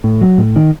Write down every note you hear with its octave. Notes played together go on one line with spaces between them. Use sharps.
A2
F#3
A2
D#3